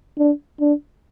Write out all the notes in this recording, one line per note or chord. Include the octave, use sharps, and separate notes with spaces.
D4
D4